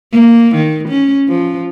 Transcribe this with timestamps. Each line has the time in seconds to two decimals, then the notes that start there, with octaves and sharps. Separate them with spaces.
0.12 A#3
0.55 D#3
0.89 C#4
1.28 F3